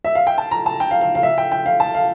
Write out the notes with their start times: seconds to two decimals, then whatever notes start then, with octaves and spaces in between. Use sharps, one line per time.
0.04 E5
0.15 F5
0.27 G5
0.38 A5
0.51 A#5
0.66 A5
0.80 G5
0.91 F5
1.01 F5
1.15 F5
1.23 E5
1.38 G5
1.52 G5
1.66 F5
1.80 A5
1.95 F5